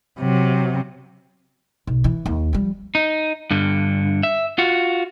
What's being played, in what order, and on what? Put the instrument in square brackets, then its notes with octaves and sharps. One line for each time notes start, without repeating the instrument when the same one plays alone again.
[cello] C3 F#3
[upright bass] B1
E3
D#2
F3 G3
[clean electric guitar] D#4
G2 D3
E5
F4 F#4